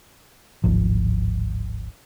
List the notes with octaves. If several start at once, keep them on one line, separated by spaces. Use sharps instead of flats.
D1 G#1 F3